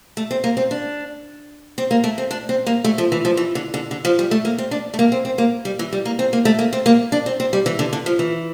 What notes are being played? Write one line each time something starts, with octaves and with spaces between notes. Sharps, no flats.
A3
C4
A#3
C4
D4
C4
A#3
A3
C4
D4
C4
A#3
A3
F3
E3
F3
E3
D3
D3
D3
F3
G3
A3
A#3
C4
D4
A3
A#3
C4
C4
A#3
G3
E3
G3
A#3
C4
A#3
A3
A#3
C4
A#3
D4
C4
C4
G3
E3
D3
D3
F3
E3